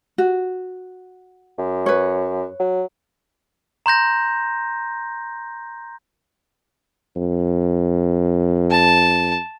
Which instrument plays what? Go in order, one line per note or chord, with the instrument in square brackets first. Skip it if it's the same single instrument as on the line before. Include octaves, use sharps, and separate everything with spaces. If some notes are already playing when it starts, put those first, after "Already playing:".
[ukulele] F#4
[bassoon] F#2
[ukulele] B4 C#5
[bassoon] F#3
[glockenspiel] A#5 C6 G6 A#6
[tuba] F2
[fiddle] A5